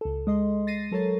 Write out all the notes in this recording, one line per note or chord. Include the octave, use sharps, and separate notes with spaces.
C#2 A4
G#3 D#5 C6
A6 A#6 C7 D#7
F#3 A4 A#4 C#5 A5 A6